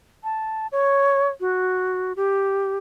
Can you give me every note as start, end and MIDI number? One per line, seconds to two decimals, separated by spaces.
0.24 0.67 81
0.72 1.29 73
1.40 2.13 66
2.16 2.78 67